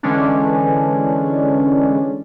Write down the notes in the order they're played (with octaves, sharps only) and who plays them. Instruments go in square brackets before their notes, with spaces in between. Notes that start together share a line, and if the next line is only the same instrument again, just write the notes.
[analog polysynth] D3 E3 G#3 C#4 D4